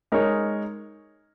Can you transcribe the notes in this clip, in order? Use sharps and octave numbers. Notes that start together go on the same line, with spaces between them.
G#3 D#4 A#4 C#5